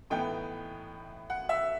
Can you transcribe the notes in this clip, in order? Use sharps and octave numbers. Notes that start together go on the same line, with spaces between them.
A2 E3 B3 D#4 G5
F#5
E5